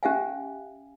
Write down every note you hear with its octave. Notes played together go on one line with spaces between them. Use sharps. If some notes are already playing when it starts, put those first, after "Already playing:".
C#4 G4 E5 F5 G#5